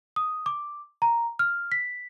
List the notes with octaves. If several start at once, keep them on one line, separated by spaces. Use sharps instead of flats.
D#6
D6
A#5
F6
B6